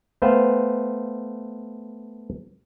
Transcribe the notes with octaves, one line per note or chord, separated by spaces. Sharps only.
A3 B3 B4 C5 F5 G5